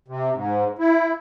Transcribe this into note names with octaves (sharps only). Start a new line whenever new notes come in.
C3
G#2
E4